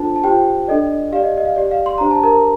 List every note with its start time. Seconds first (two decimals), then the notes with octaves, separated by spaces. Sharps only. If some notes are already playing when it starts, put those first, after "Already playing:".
Already playing: D4 F4 A4 C5 A5
0.16 A5
0.24 F4 G4 C5 G5
0.68 D4 A4 D5 D#5
1.12 G4 F5
1.16 D5
1.23 D#5
1.37 D#5
1.45 F5
1.56 G4 D5
1.71 F5
1.86 C6
1.98 D4 G4 C5 A#5
2.11 A5
2.23 A#4 A#5